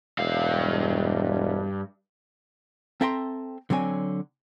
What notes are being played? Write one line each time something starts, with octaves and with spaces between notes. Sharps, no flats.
E1 G2 F5
C4 A4 E5 G5 A#5 C6
D3 F#3 C4 C#5 G#5